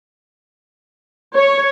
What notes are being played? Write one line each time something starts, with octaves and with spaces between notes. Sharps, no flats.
C#5